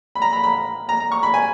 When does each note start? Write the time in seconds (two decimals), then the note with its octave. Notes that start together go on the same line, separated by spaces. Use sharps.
0.15 B5
0.22 A#5
0.33 B5
0.44 B5
0.89 A#5
1.00 A#5
1.12 C#6
1.23 B5
1.34 G#5